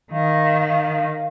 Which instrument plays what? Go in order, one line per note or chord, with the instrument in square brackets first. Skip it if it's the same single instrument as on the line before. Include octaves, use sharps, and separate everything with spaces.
[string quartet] D#3 [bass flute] F5